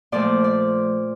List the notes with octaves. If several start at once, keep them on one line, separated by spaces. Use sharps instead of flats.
A#2 F3 A3 D5
D5